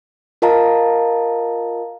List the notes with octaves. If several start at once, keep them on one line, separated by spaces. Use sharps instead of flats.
F4 A#4 D#5 F5 A5 A#5